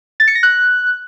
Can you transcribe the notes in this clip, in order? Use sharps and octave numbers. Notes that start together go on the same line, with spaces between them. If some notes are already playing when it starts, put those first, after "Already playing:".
A6
C#7
A#6
F#6